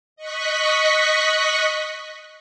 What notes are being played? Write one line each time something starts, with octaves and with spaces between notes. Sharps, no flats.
D#5 C#6 F#6 B6